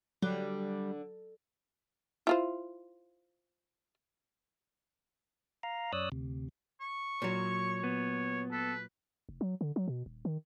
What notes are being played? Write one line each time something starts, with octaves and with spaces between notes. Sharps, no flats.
D3 F#3 G3
E4 F4 C5
F5 A#5
F#2 C#5 D5 D#6 E6 F#6
D2 C3
C#6
A#2 F#3 C#5
B3
A4 B4
F1
F#3
D3
F#3
B2
D#1
D#3